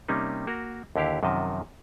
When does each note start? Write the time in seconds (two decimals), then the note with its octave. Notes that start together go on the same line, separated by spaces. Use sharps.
0.08 C3 G3 A#3 C#4 D#4
0.47 A#3 F#4 A#4
0.96 D#2 D3 E4 G4 F5
1.23 F#2 C3 D#3 F3 D#5 A5